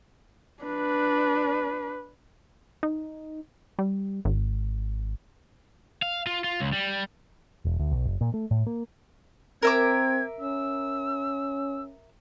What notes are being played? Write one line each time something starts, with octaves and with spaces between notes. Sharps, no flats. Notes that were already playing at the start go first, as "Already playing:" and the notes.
D4 B4
D#4
G3
G#1
F5
F4
F4
C#2
G3
E1
D2
B1
F#1
A#2
A3
A2
A#3
C4 A#4 E5 D6 G#6
C#4 E6